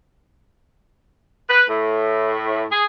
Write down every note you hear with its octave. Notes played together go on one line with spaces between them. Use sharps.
B4
A2
G#4